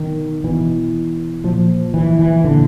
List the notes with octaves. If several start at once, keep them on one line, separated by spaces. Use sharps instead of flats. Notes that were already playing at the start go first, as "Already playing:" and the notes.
Already playing: B2 D#3
B2 E3
A#2 F3
E3
E3
A#2 D3